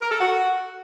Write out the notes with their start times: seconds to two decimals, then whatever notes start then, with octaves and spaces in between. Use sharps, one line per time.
0.01 A#4
0.11 A4
0.21 F#4